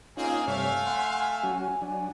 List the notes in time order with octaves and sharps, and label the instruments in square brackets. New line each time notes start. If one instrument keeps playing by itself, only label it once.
[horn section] A#3 C4 G#4 [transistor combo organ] C#4 D#4 F4 [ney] G#5
[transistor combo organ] G2 C3 C#5 [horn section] A3 E5 F5
[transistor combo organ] F#5 C6
F#3 C#4 F#4
F#3 D4